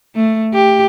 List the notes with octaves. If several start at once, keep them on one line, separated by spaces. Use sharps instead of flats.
A3
G4